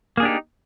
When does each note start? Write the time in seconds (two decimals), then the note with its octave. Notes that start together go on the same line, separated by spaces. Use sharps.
0.17 A#3
0.20 G#4
0.23 D4
0.25 G4
0.28 D#4